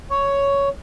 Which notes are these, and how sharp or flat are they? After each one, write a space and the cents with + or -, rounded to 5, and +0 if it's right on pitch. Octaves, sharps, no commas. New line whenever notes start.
C#5 +5